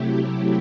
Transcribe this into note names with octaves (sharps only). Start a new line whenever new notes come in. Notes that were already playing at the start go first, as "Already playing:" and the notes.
Already playing: C3 F#3 A3 E4 G4